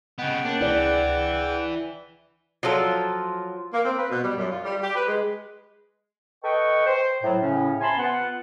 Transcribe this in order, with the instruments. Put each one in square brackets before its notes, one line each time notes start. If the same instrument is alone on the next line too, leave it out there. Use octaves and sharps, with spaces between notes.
[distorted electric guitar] C#3 B3 [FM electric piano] D#5 [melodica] F#5 G5
[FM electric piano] A#3 C#4 [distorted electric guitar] D4
[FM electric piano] C#2 C3 G#4 [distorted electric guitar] E3 [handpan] E4 D5
[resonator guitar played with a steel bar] F3 F#3 F4 A4
[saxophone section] A#3
C4
B4
B2
G3
F#2
F4
G3
G4
B4
G#3
[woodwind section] A4 B4 D#5 G5 C#6
C5
A2 F#3
A2 C#3 C#4
C3 G#5 A5 B5 C6
B3 F4 F#5